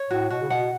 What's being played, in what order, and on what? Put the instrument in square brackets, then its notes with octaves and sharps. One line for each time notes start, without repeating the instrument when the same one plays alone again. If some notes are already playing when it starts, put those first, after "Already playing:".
Already playing: [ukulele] C#5
[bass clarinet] A2 [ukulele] F#4
[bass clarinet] B2 [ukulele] F#4
[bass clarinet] C#3
[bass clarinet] B2 [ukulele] F#5